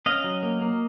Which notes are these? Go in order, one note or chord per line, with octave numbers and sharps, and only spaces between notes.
C#4 D#5 F5
F#3
A#3
A#3